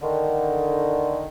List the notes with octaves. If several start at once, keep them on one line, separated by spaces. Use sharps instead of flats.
D3 D#3